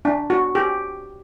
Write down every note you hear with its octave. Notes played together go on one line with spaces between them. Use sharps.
D4
F#4
G4